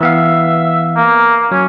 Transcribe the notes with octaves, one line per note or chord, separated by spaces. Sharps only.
E3 B3 E5 F5
A#3
F#3 C#4